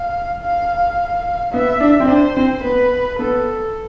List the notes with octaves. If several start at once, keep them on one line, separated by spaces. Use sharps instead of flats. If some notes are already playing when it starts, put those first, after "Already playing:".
Already playing: F5
F5
B3 E5
D4
C4
D4 C5
C4
B3 B4
B3 A4